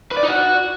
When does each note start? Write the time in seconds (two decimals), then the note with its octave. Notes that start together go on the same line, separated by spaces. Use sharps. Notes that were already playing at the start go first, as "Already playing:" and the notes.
0.11 B4
0.17 D5
0.23 D#4
0.28 F#4